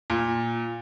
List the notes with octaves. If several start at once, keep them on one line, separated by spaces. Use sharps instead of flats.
A#2